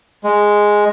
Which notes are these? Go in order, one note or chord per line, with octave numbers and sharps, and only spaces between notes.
G#3